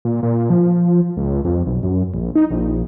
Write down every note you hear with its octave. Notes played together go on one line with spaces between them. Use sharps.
A#2
A#2
F3
C#2
F2
B1
F#2
A#1
D#4
A#1